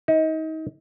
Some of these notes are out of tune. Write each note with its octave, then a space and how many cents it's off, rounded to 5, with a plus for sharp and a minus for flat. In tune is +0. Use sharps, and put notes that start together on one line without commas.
D#4 +30